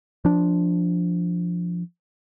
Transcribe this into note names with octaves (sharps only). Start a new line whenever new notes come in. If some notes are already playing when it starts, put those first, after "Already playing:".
F3 D4